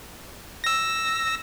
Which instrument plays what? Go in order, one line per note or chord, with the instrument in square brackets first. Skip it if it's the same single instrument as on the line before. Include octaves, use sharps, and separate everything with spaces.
[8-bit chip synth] E6 A#6